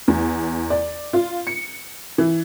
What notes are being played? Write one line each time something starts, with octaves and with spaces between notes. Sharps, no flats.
E2
D5
F4
C#7
E3